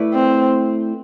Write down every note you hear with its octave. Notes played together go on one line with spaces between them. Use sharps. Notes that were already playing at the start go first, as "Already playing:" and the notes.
Already playing: A3 E4 B4 D5
C4